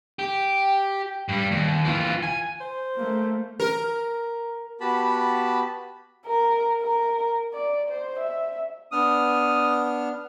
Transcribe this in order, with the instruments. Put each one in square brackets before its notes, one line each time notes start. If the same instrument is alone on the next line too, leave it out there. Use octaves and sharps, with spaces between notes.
[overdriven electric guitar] G4
G2 G3
D#2
E3 F4
G#5
[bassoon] C5
[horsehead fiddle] A3 A#3
[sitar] A#4
[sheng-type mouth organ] B3 F#4 G4 A5 B5
[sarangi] A#4
A#4
D5
C5
E5
[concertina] B3 D4 F6 [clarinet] D#6